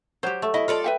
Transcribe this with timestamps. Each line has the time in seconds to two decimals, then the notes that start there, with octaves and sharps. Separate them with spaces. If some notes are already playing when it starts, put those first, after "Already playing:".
0.23 F#3 G4 C5
0.42 A3
0.54 E4 D#5
0.68 F4 A4 D5
0.84 B4 E5 G5